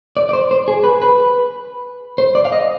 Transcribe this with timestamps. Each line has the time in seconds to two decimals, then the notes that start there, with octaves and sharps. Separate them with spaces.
0.17 D5
0.29 D5
0.33 C5
0.51 C5
0.68 G#4
0.84 B4
1.02 B4
2.18 C5
2.35 D5
2.45 F5
2.52 D#5